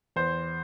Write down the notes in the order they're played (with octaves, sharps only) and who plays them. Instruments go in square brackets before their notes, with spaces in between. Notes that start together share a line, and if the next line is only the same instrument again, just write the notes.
[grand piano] E2 C5